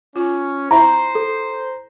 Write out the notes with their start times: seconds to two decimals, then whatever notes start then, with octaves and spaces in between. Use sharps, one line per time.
0.16 C#4 F4
0.71 E4 C5 E5 A#5 B5
1.15 A4